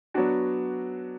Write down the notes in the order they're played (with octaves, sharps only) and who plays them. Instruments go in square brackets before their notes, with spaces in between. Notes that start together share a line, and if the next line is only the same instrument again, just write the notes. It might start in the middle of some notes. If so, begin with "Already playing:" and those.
[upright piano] F#3 B3 D4 F#4